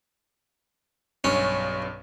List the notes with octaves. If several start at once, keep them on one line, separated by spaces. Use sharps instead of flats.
B1 G2 C#4